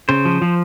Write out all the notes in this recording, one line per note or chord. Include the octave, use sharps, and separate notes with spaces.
C#3 C5
F3
F3